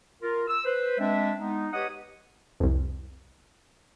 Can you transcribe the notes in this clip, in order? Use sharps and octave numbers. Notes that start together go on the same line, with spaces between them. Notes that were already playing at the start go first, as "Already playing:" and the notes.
F4 A#4
E6
B4 C5
G#3 C4 D4 E5
G#3 B3 D#4
G4 B4 C#5 D#5 F#5 D#6
C2 F2